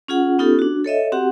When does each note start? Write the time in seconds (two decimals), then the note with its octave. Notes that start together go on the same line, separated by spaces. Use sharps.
0.08 C#4 F4 G#4 F#5
0.39 B3 C#4 D#4 F4 G4 A4
0.59 D4 F#4
0.84 A4 C#5 D#5 E5
1.12 C4 F#4 G4 F#5